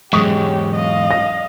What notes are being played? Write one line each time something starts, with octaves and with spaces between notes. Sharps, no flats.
E2 G#2 F#3 G#3 G4 C#6 D#6
D#5 F5
A#6